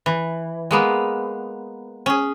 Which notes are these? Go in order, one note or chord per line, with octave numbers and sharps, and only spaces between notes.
E3
G#3 A#3 B3
C#4 G#4